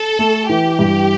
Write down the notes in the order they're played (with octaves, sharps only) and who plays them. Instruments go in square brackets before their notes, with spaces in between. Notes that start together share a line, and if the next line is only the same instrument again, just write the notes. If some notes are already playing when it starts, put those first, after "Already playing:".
Already playing: [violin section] A4
[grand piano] A3
[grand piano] E3 [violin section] G4
[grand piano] G2